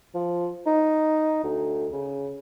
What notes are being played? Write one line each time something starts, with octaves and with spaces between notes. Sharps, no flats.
F3
D#4
D2
C#3